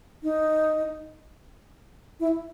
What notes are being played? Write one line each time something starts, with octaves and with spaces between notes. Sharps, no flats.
D#4
E4